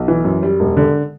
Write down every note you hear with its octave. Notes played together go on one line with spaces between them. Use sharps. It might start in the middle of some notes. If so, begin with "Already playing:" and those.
Already playing: B1
E3
F#2
G3
E1
D3